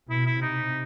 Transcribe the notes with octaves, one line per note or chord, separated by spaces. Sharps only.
B2 E4
E4
C3 D#4